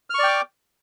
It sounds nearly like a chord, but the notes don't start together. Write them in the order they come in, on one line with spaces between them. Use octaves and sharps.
F6 C#6 D5 G5 D6